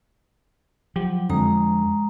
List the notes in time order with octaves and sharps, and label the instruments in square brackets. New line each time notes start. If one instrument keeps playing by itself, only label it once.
[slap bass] F3 [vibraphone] F#3 [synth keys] G4
[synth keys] F2 D3 [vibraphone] G#3 A#5 D#6